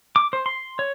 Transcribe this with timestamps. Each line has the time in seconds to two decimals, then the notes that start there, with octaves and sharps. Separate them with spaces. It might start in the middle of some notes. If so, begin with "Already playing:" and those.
0.16 D6
0.33 C5
0.46 C6
0.79 C#5